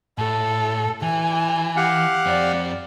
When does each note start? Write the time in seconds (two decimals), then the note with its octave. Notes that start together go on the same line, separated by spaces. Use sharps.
0.18 A2 A4
1.02 E3 G#5
1.77 G4 F5 F#5
2.26 F2 C4 D5